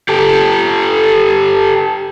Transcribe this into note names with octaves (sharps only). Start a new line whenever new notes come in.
G4 A4